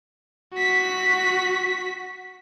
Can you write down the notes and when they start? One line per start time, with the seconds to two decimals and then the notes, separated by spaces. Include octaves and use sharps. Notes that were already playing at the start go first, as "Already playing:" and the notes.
0.54 F#4 B6